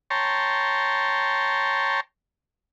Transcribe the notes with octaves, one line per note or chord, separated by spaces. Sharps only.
C#5 G5 A5 A#5 C6